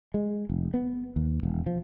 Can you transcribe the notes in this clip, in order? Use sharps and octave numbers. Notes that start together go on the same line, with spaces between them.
G#3
F1
B3
D#2
E1
F3